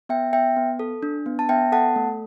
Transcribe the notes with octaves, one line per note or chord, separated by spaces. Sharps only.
B3 E5 G5
B3 E5 G5
B3
A4
D4
B3
A5
B3 E5 G5
A4 F#5 A5
A3